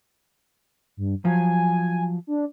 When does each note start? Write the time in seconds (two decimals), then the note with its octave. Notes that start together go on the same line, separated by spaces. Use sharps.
0.97 G2
1.25 F3 F#3 G#5
2.27 D4